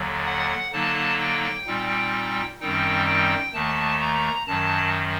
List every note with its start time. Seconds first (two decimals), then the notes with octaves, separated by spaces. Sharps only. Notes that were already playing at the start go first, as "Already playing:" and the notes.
Already playing: D#2 D3 F#3
0.26 F#5
0.73 D3 F#3 A#3 D#4 A5
1.20 G5
1.67 A#2 G3 C4 D#4
2.60 F#2 D#3 G3 C4 D#4 G5
3.06 G5
3.54 D#2 D#3 A3 A5
4.01 A#5
4.47 F#2 D#3 F#3 A5